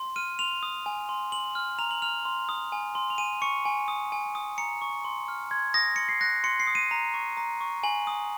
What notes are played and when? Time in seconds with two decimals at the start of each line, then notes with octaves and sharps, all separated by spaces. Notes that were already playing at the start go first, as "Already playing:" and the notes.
Already playing: C6
0.16 F6 D#7
0.39 C6 F7
0.63 D#6
0.86 G#5
1.09 C6
1.32 C6 F#7
1.55 F6
1.79 A#5 F7
1.91 F#7
2.02 F6 F7
2.25 C6
2.49 D#6
2.72 G#5
2.95 C6
3.10 F7
3.18 G#5 D#7
3.42 C#6 C#7
3.65 G#5
3.88 D#6
4.12 G#5
4.35 D#6
4.58 A#5 C#7
4.81 C#6
5.05 C6
5.28 F6
5.51 C6 G#6
5.74 D#6 A#6
5.96 C6 C#7
6.09 C7
6.21 F#6 A#6
6.44 C6 C#7
6.60 C7
6.67 D#6
6.75 D#7
6.91 A#5
7.14 C#6
7.37 A#5
7.61 C#6
7.83 G#5 F#7
8.07 D#6